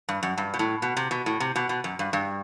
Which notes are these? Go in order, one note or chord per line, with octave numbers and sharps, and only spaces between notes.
G2
F#2
G2
B2
A2
B2
C3
B2
A2
C3
B2
B2
F#2
G2
G2